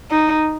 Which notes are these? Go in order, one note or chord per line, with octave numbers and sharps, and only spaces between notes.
D#4